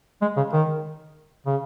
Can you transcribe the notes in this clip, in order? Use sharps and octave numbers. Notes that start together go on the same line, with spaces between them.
G#3
C#3
D#3
C#3